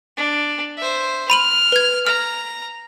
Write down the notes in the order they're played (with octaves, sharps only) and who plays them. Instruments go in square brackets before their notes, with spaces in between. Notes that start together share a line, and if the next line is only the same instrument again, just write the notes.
[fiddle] D4
C5 E5
[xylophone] B5 D#7 F#7 [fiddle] F6
[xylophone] B4 G#6
[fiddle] A#5 [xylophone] F6